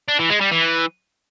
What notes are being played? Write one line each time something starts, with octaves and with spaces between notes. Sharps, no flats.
D4
E3
G#3
G3
E3